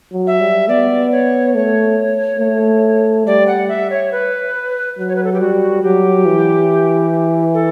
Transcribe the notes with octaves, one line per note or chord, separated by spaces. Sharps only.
F#3
E5
G3
B3 D5
C#5
A3 C#5
A3
G3 D5
F#5
E5
C#5
B4
F#3
C#5
B4
A4
G4
G3 F#4
F#3 G4
E3
A4